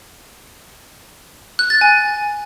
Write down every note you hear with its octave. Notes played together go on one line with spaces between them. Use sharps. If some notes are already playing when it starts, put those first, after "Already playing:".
F#6
A6
G#5